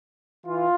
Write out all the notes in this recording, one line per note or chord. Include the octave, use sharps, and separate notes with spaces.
E3 F4